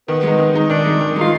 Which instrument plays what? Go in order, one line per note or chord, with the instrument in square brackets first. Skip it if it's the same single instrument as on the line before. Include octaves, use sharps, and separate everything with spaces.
[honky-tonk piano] D#3 [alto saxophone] B3
[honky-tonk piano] G#3 D#4
D#3
G#3 D#4
[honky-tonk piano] D#3 [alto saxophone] D4
[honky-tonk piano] G#3 D#4
D#3
[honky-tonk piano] G#3 D#4 [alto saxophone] F4